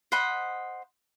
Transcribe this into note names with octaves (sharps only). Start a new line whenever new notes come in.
C5 D#5 F#5 B5